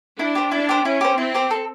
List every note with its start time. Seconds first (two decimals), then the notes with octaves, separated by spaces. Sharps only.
0.19 D4 E4
0.35 G4 C5
0.51 D4 E4
0.69 G4 C5
0.84 C#4 E4
1.01 G4 C5
1.18 C4 E4
1.35 G4 C5
1.51 A4